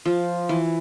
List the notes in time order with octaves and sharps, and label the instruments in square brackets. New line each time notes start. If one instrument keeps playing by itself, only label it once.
[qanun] F3
E3